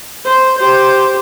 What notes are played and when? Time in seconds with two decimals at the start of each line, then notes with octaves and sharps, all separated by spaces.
0.25 C5
0.59 G4 C5